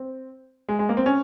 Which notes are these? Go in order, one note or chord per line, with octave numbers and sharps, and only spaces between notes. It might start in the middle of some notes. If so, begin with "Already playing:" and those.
Already playing: C4
G#3
G#3
A#3
C4
C#4